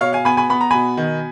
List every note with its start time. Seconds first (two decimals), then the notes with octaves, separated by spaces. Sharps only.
0.01 B2 C#5 F5
0.13 F5 G#5
0.25 B3 G#5 B5
0.37 G#5 B5
0.50 B3 B5
0.61 A#5
0.71 B2 G#5 B5
0.97 D#3